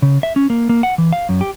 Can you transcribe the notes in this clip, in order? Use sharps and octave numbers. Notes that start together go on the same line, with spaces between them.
C#3
E5
C#4
A#3
A#3
F#5
E3
F5
F#2
G4